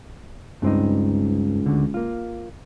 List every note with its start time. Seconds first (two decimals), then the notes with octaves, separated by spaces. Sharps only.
0.62 C#2 G2 C4 D#4
1.66 D2 D3
1.94 A#3 F4